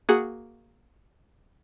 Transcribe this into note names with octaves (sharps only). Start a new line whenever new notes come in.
A#3 F#4 G#4 F#5